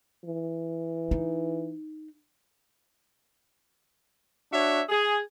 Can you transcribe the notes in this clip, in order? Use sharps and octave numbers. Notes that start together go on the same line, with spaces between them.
E3
D#4
D4 F#4 C#5 E5
G#4